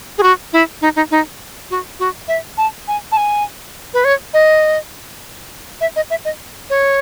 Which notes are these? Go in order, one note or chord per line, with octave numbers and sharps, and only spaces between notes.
G#4
F#4
E4
D#4
D#4
D#4
F#4
F#4
E5
A5
G#5
A5
G#5
B4
C#5
D#5
E5
D#5
E5
D#5
C#5